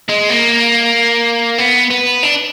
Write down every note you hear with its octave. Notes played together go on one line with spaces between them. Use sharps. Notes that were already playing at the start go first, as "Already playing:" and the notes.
G#3
A#3
B3
B3
D4